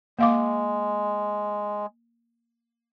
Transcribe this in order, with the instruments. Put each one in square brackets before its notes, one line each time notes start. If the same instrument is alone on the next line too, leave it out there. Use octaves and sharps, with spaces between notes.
[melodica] G#3 [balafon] A#3 F5 D6